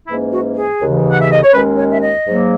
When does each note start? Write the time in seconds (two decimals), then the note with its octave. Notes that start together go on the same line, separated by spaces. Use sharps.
0.07 G#2 E3 A#3 C#4 E4
0.32 F#4
0.56 G#4
0.80 D#2 C#3 E3
1.10 F#5
1.21 E5
1.32 D#5
1.43 C#5
1.53 D#2 D#3 G#3 C#4 B4
1.78 C#5
1.92 E5
2.02 D#5
2.27 G#2 F#3 A#3